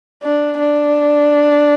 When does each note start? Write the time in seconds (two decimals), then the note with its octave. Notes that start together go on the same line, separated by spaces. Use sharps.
0.23 D4
0.59 D4